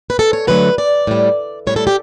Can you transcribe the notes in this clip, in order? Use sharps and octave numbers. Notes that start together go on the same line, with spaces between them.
B4
A4
C#5
D3 F#3 A3 B4
D5
A2 G3
A2 G3 C#5
A4
G4